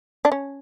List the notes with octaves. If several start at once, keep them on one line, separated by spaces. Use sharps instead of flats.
D4
C#4